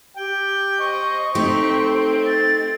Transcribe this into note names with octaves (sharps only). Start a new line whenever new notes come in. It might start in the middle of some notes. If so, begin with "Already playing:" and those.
G4 G5
C5 D#5 C#6
A3 C4 D#4 G4
A6